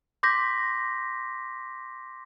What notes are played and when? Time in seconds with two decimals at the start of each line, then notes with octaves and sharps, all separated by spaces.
0.23 C6 D6 G6 A#6 B6